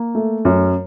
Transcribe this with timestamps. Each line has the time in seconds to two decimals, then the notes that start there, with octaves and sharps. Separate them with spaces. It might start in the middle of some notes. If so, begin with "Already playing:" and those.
Already playing: A#3
0.15 A3
0.45 F#2